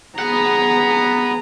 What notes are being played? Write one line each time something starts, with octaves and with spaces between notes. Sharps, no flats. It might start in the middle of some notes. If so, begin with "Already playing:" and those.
B3 G#4 F#5 A#5